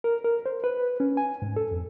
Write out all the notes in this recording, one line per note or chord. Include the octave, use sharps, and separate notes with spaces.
A#4
A#4
C5
B4
C#4
G#5
G#2
A4
F2